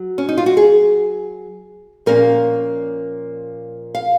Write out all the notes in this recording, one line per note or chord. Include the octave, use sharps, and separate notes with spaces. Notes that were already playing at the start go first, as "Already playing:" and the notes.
Already playing: F#3
C#4
D#4
F4
F#4
G#4
A#2 F3 A#3 C#4 A#4
F5